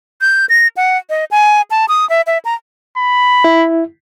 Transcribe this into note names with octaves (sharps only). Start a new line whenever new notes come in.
G6
A#6
F#5
D#5
G#5
A5
D#6
E5
E5
A#5
B5
E4